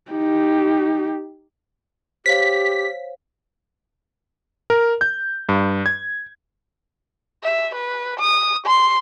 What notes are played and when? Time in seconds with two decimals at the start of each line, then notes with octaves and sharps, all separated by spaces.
0.11 D#4 G4
2.26 G4 C5 C#5 F5 B6
4.70 A#4
5.01 G6
5.49 G2
5.86 G#6
7.43 E5
7.75 B4
8.20 D#6
8.66 C6